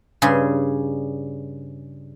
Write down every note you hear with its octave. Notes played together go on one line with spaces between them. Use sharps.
G2 C#3 G#4 C6